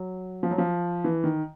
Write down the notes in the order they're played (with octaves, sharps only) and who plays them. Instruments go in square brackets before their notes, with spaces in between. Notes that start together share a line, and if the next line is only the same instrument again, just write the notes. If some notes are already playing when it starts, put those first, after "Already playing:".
Already playing: [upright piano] F#3
F3
F#3
F3
E3
D#3